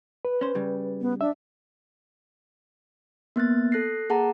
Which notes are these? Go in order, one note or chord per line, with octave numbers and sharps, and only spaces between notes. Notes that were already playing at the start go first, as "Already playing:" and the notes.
B4
C#4 C5
C#3 G3
B3
D4 E5
A#3 B3 F#6 A6
A4 F#6 A#6 C7
A#3 G#4 F#5 A5 A#5